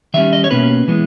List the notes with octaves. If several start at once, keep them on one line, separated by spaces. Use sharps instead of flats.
D#3 G3 C#4 E5
D#5
C#5
B2 A#3 C#4 B4
E3 G#3 B3